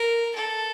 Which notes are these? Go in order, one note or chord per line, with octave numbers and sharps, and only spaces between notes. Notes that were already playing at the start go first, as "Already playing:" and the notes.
Already playing: A#4
A4